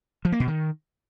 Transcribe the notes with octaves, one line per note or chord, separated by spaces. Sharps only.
F3
A#3
B2
D#3